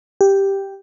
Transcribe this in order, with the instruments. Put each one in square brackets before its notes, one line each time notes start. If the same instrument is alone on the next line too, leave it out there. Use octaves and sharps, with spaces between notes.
[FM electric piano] G4